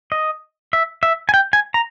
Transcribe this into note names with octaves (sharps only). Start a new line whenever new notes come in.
D#5
E5
E5
G#5
G5
G#5
A#5